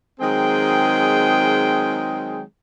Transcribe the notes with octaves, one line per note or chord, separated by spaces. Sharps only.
D#3 F#3 G#3 C4 G#4 G5